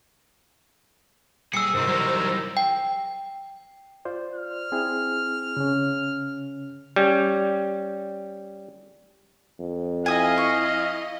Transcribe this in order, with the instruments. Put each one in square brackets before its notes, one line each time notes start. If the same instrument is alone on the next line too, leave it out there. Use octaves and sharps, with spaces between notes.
[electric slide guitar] A#2 G3 G#5 [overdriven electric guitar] G#4 [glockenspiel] E6 C#7
[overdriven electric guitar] G#2 F#3 [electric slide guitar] C3 D#4 [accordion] A#4 C5
[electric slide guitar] E3 G3 [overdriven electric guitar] F#3 D#4
[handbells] G5
[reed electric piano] F4 C5 D5
[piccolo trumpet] F6
[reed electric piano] C4 E4 G#4
C#3 C#4
[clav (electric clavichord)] G3 C#4
[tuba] F2
[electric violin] E4 D#5 [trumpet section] F5 [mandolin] G#5 D#6
[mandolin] C#6